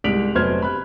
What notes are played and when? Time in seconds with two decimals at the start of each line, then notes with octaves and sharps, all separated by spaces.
0.04 C2 G#2 B6 D7 F7 F#7
0.35 F1 F#3 B3 C5 F6 G#6
0.62 B5 F#6